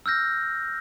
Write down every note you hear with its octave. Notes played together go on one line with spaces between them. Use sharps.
E6 F6 G6 A#6